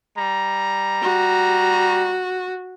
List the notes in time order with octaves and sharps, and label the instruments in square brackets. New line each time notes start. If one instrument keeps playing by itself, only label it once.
[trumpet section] G3 A#5
[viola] F#4